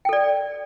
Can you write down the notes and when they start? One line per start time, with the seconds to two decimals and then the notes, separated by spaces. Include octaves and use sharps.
0.05 G5
0.09 A4
0.13 D5